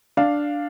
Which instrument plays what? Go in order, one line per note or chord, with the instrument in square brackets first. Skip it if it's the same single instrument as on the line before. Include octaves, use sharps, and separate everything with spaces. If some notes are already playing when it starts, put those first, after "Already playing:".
[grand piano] D4 F5